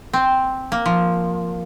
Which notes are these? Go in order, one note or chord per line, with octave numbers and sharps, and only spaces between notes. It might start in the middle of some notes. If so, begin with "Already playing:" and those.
C4
A#3
F3